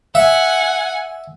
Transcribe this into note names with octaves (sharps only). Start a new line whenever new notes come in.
E5 F#5 G#5